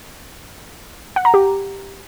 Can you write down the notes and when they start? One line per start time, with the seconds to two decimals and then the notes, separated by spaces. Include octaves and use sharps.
1.16 F#5
1.25 A#5
1.34 G4